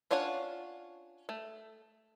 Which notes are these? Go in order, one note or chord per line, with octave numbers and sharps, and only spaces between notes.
C#4 D4 F4 C#5 F#5
A3